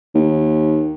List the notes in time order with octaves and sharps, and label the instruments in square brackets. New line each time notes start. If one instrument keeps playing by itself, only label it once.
[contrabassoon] D#2